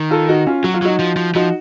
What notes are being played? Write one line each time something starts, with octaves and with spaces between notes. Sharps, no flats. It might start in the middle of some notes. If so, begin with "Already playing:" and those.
Already playing: D#3
F4 A4
D#4 F#4
C#4 F4
F#3 F#4
F4
F#3 D#4 F#4
F3
F3
F3 D#4 F#4